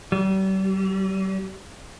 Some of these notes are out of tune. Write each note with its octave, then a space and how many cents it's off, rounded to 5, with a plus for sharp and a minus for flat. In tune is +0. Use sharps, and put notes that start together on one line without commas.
G3 -40